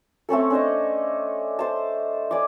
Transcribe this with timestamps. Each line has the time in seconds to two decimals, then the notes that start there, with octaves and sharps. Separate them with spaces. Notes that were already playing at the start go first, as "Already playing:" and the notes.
0.29 A3 C4 C#4 A4
0.50 C#4 D4 C5 D#5
1.59 C5 A5
2.31 D5 G#5 B5 D6